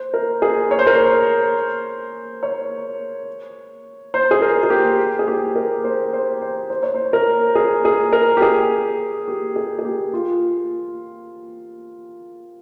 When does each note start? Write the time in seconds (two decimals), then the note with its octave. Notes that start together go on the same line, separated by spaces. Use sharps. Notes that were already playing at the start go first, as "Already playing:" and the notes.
Already playing: C5
0.14 A#4
0.42 G#4
0.71 C#5
0.79 C5
0.87 A#4
0.94 C5
2.43 C#5
4.14 C5
4.31 G#4
4.42 A#4
4.63 G#4
4.70 G4
5.19 G#4
5.28 G4
5.56 A#4
5.84 C5
6.13 C5
6.42 C5
6.70 C5
6.83 C#5
6.95 C5
7.13 A#4
7.55 G#4
7.85 G#4
8.13 A#4
8.37 G4
8.42 G#4
9.28 G4
9.56 G#4
9.79 G#4
9.85 G4
10.14 F4